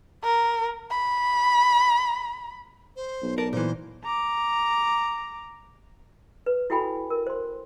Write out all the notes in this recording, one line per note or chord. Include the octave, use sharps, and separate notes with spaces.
A#4
B5
C5
B1
A#4 D5 A5
A#2 E3 C5
A#5 D6
B4
E4 F#4 A4 G5 G#5 B5
A#4
C5 C6